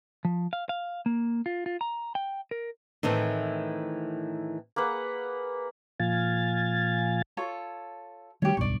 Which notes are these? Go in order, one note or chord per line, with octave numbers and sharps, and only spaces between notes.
F3
F5
F5
A#3
F4
F4
A#5
G5
A#4
A2 D#3 E3 A3 C4
A#3 G#4 B4 F#5
A#2 F3 F5 G#5 A6
F4 A4 C#5
D#3 G3 A3 G4 C#5
D1 B1 G2 D5 C#6